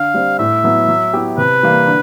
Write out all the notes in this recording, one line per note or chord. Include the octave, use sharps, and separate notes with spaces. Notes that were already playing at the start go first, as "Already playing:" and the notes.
Already playing: D3 F5
G3 C4
A2 E5
F#3 B3 E4
F#3
B3 E4 G4
C3 B4
E3 G3 A#3
D3